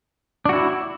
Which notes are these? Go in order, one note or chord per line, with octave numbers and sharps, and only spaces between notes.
D4 E4 F#4